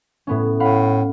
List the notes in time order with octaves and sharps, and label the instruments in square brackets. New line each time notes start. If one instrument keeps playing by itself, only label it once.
[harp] A2 B3 C#4
[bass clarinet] A2 [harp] F5 F#5 B5